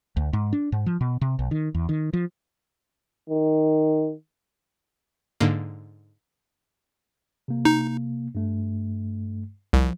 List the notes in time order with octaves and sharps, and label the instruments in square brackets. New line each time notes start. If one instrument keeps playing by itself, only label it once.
[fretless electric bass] D2
G#2
D4
G#2
F3
B2
C3
B1
D#3
E2
D#3
F3
[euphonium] D#3
[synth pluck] G#2 D3 A#3
[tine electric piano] C3 A#3
[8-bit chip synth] D#4
[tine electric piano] G2 A3
[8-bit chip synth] C2 [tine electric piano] F3